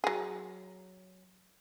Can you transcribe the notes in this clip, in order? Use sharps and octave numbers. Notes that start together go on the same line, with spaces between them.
F#3 G#4